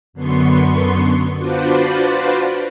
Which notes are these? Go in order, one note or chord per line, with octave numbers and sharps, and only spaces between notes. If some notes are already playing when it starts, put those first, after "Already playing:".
F#2 D3 B3 C6 C#6
D4 F4 F#4 B4 C5 D5